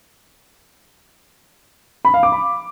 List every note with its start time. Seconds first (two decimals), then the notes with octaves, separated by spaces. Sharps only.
2.05 B5
2.14 F5
2.23 D6
2.32 B5